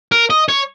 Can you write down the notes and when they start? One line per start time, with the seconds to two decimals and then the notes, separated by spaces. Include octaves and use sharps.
0.12 A#4
0.30 D#5
0.48 C#5